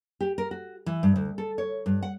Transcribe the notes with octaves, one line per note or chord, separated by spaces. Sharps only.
G4
A#4
F#4
E3
G2
D2
A4
C#5
G2
F#5